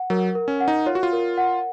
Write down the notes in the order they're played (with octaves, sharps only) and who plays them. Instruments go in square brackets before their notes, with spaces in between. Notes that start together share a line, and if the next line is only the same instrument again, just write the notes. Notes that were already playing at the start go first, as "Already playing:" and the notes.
Already playing: [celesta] F#5
[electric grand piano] F#3 [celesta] A#4
[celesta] A#4
[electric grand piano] C#4
[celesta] F#5
[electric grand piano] D#4
[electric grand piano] F4 [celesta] C#5
[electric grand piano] F#4
F4
[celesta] A#4
F#5